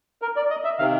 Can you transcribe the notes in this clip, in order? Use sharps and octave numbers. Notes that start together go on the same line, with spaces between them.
A#4
D5
D#5
E5
C3 D#3 F5